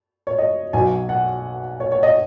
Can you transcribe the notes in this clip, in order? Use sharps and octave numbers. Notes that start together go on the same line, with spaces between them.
C#5
D#5
B1 B2 F#3 G#5
F#5
C#5
C#5
D#5